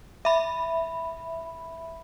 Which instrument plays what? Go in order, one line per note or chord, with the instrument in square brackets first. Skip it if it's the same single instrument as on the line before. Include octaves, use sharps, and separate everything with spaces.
[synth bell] E5 B5